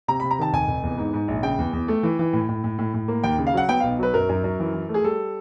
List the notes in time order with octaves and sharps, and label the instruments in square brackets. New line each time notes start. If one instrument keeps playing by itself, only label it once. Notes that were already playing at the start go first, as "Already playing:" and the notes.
[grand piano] C3 A#5
C3 B5
A#5
D#3 A5
F1 G#5
F1
E2
G#2
G#2
A#1
C#3 G5
E2
E2
A3
E3
E3
A2
A2
A2
A2
A2
A#3
D#2 G5
C#3
F5
F#3 F#5
B3 G5
B1 F5
F#3 B4
F#2 A#4
F#2
F#2
E3
E3
A3
G#4
G3 A4